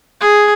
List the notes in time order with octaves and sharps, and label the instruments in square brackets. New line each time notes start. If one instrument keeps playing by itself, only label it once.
[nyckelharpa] G#4